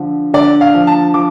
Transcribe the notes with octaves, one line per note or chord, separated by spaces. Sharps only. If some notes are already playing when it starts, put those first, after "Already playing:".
Already playing: D3 F3
D3 D5
F5
F3
A5
F3 D6